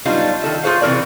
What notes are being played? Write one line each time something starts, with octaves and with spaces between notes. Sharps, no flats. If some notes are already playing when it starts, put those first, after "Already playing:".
F#3 G3 B3 D4 D#4 F4
D#3 A4 E5
F4 G#4 C5 C#5 F5
C3 E3 A4 A#4 C#5 D5